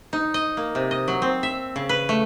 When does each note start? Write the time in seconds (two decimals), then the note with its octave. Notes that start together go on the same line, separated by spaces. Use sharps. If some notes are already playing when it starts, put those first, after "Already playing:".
0.13 D#4
0.34 D#5
0.57 A#3
0.75 C3
0.91 D#5
1.08 F#3
1.22 C4
1.43 E5
1.76 C#3
1.89 B4
2.09 A3